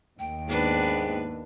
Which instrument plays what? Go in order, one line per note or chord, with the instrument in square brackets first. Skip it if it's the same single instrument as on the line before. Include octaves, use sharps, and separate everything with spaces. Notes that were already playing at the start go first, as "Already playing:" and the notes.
[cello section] D#2 [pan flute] G5
[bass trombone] G#2 [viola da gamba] B3 D4 B4